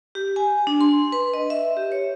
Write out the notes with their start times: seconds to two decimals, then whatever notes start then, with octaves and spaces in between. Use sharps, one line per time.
0.15 G4
0.36 G#5
0.67 D4
0.81 C6
1.12 B4
1.34 D#5
1.50 E5
1.77 G4
1.92 C#5